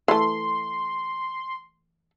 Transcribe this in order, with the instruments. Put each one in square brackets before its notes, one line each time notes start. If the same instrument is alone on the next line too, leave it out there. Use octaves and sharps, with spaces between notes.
[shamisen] E3 A3 [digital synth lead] C6